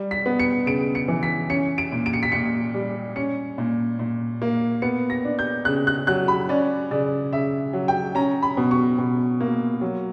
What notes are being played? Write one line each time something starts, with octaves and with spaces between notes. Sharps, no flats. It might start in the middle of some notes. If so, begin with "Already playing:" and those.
Already playing: G3
B6
B3
C#7
C#3 D7
C#7
E3
B6
C#4 C#7
D7
A#2
D7
C#7
B6
A#2 C#7
G3
C#4 C#7
A#2
A#2
A#3
B3 C#7
A#6
D4
G6
C#3 F#6
F#6
F#3 F#6
B5
C#4 D5
C#3 D5
C#3 E5
F#3
G5
C#4 A#5
B5
B2
C#6
B2
A#3
F#3